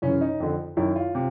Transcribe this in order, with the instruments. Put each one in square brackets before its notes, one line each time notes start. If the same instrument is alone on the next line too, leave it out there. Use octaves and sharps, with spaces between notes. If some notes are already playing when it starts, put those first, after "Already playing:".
[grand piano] F#2 C#3 E3 C#4
D#4
F2 D3
F#2 D#3 E4
F4
C3